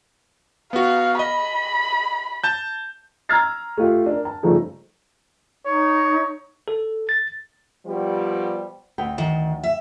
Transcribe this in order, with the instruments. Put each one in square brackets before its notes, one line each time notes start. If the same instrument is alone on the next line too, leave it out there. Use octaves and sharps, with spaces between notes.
[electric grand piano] B3 F#4 [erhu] F5
[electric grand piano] D#5 [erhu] B5
[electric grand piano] A5 G6
[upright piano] A#5 E6 F6 G#6 A6 C7
A3 F4 G4
D4 A#4
A5
G2 C#3 F3 A3 D#4
[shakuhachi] D#4 [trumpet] C#5
[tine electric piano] A4
A6
[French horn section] B2 F3 G3
[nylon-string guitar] D2 B4 G5
[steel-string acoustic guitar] D#3
E5